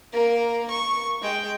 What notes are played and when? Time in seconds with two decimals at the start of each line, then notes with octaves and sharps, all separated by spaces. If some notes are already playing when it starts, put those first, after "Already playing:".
0.13 A#3 A#4
0.70 C#6
1.21 G#3 G5